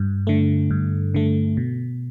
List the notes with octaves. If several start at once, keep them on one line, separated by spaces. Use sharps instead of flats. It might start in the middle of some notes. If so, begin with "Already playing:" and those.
Already playing: G2
D3 A3
G2
D3 A3
B2